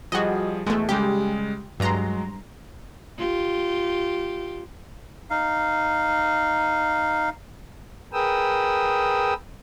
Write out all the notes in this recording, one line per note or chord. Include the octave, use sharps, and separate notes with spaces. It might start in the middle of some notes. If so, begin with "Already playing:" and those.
F3 G3 F#4 G#4 D#5
E2 G#3 A3
C#3 G3 G#3 G4
G2 F#3 G#3 A#5 C6
F4 G4
D#4 F5
G#4 A#4 B4 G5 D#6 E6